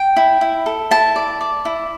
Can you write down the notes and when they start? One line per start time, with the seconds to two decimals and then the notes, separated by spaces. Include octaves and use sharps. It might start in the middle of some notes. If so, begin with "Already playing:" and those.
Already playing: G5
0.16 E4
0.41 E4
0.66 A4
0.91 E4 A5
1.16 D5
1.41 D5
1.65 E4